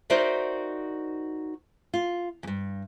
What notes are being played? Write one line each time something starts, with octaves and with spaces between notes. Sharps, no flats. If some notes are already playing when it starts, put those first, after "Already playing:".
D#4 F#4 A#4 C5 D5 E5
F4
E2 G2